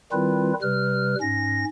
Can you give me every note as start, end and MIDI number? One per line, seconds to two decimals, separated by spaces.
0.12 0.53 51
0.12 0.53 55
0.12 0.53 60
0.12 0.53 64
0.12 0.53 65
0.12 0.53 71
0.62 1.15 48
0.62 1.15 55
0.62 1.15 71
0.62 1.15 89
1.21 1.65 44
1.21 1.65 61
1.21 1.65 94